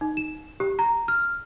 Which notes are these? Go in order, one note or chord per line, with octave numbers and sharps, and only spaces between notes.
D#4
E7
G4
A#5
F6